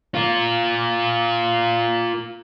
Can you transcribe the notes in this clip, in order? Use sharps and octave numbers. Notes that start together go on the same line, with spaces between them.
F4 A#4